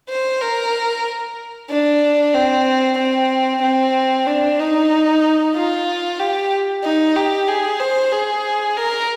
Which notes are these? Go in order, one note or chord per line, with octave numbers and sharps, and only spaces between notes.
C5
A#4
D4
C4
C4
C4
D4
D#4
F4
G4
D#4
G4
G#4
C5
G#4
A#4